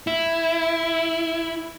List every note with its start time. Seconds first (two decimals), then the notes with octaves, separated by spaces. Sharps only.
0.07 E4